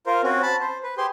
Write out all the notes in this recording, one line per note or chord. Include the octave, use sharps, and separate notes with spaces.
F4 A#4 C5
C4 C#4 F#4
A5 B5
C5
B4
G4 G#4 C5 C6